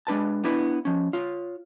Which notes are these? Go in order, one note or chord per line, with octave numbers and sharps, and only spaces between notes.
G#3 D4 B4 A5
B3 D4 E4 B4
F3 C#4
F4 C#5